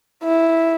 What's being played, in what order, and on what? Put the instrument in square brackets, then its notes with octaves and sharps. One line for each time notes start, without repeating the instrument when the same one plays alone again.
[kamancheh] E4